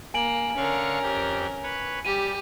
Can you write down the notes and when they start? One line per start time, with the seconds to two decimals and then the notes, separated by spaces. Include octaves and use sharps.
0.14 A#3 G#5 D7 F#7
0.57 D3 C#4 A#4 F5 C#6
1.03 F2 G4
1.63 B4 C#5
2.05 G3 G4 D#7